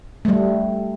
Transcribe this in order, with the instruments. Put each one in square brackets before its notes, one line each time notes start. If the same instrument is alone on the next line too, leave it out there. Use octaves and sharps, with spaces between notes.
[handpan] G3 A3